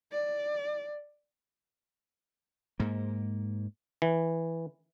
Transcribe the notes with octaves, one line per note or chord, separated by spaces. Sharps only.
D5
G#2 A#3
E3